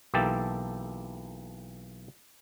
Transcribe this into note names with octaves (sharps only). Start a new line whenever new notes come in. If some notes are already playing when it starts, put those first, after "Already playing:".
B1 E3 A#3 G4 A4 A5